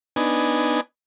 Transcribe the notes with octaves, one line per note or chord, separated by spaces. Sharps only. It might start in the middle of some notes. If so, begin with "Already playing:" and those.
B3 D4 D#4 G#5